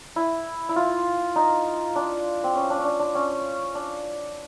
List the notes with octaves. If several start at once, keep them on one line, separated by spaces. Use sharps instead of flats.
E4
E4
F4
D#4
D4
C4
C#4
D4
C#4
D4
D4
C#4
D4